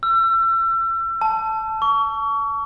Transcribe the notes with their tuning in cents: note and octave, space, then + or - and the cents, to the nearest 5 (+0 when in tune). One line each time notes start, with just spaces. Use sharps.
E6 +35
A5 -5
C#6 +35